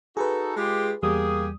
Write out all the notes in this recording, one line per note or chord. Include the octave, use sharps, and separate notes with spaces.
D#4 F#4 G#4 A4 B4
G#3 F4 G4
E2 G3 A#3 G4 G#4 D#6